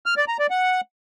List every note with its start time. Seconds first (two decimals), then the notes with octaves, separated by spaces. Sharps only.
0.06 F6
0.17 D5
0.28 A#5
0.39 D5
0.50 F#5